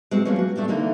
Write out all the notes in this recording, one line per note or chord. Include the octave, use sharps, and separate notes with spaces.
G#3 C4 F#4
F3 F#3 A#3 B3 C#4
F#4
A3 C4 D4 G4
D3 E3 A#3 D#4 A#4